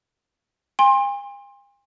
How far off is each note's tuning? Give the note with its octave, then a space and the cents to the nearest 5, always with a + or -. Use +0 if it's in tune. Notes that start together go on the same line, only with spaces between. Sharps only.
G#5 -45 C6 +20